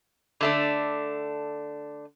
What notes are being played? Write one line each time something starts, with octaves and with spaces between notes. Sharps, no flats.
D3 A3 D4